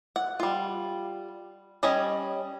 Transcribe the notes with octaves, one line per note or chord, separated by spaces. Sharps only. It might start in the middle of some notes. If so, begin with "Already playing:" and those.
F#5
G3 F4
G3 C#4 C#5 D#5